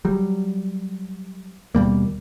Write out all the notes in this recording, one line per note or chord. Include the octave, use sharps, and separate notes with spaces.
F#3 G3
D#2 B2 G3 A#3